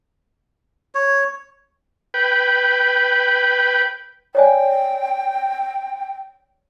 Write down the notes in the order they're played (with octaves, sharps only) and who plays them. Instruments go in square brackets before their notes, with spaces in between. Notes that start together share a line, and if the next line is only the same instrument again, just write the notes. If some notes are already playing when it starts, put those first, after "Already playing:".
[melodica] C#5
[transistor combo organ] B4 G5
[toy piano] C#5 D5 G#5 [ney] G5